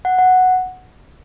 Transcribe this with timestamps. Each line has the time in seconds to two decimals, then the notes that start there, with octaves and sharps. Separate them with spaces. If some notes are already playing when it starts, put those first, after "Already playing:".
0.05 F#5
0.19 F#5